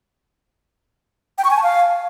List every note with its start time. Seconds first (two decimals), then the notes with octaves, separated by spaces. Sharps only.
1.38 G5
1.44 C#6
1.51 G#5
1.57 A5
1.63 F5